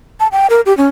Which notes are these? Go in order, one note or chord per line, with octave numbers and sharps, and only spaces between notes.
A5
G5
A#4
G4
C#4